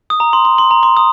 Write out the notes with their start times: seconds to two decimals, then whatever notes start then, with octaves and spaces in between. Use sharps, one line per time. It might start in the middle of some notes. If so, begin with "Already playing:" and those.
0.10 D#6
0.20 A#5
0.33 C6
0.45 C6
0.58 C6
0.71 A#5
0.83 C6
0.97 D#6